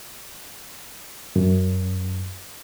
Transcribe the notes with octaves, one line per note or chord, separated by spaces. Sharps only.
F#2